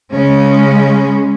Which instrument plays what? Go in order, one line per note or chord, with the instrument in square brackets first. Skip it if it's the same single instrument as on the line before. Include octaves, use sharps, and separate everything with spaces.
[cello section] C#3 G#3 C#4